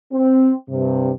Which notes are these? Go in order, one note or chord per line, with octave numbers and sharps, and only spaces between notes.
C4
G2 C3